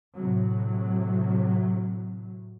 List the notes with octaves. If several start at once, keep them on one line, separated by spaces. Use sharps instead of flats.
A2 C3 F#3